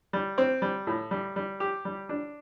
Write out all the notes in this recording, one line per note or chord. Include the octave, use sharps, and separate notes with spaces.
G3
C4
G3
A2
G3
G3
G4
G3
D4